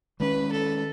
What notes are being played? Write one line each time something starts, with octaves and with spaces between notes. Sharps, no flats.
D#3 G#3 C#4 B4
A4